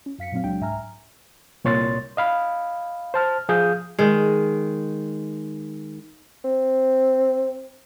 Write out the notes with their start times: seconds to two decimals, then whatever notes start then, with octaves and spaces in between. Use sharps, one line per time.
0.06 C#4
0.18 F#2 F5 B6 C#7
0.32 A#2 F#3 A3 C4 F5
0.44 C#2 F#3 G#3 D4 G5
0.60 C2 G#2 E5 G#5 A#5 F6
1.64 C2 A#2 C#5 C6 A6
2.17 D#5 F5 B5
3.14 C5 A5 F6
3.49 F3 G#4 F5 D#6 G6
3.99 D#3 G#3
6.45 C4